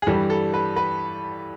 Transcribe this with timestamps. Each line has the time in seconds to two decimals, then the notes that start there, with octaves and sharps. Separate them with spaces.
0.02 G#4
0.06 G2 E3 G3 A4
0.30 A4
0.54 B4
0.76 B4